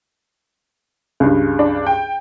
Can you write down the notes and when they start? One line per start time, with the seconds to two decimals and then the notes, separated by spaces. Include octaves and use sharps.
1.20 C#2 G2
1.59 D4
1.87 G5